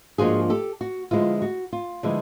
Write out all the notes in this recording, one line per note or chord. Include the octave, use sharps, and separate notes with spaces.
G#2 F3 A#3 D4 F4 F#4 G#4
G4 A4
F#4
D3 F3 G#3 B3 E4 F4
F#4
F4
D3 F3 G#3 B3 E4